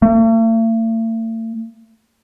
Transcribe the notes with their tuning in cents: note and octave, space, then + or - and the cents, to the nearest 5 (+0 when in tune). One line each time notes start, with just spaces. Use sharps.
A3 +45